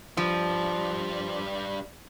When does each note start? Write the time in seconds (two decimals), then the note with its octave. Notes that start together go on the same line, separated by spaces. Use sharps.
0.17 F3 G3 D4